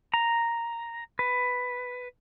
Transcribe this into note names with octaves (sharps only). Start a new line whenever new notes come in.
A#5
B4